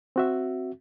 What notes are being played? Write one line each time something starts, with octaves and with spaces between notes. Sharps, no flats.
C4 F#4 E5